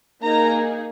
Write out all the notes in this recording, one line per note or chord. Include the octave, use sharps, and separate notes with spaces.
A#3 D#4 G#4 A#5